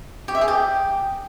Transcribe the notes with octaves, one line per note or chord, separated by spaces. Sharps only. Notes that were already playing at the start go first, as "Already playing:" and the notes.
G4
E5
G#4
G4